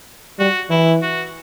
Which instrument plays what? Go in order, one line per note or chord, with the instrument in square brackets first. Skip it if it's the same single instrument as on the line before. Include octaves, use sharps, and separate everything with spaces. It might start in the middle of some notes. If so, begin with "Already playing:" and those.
[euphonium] G3 [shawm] F#4
[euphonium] E3 [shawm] E4
[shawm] F#4